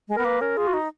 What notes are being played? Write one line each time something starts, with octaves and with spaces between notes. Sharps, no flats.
G#3
B3 A#4
A#3 B4
C#4 A#4
F4 G#4
F#4
D#4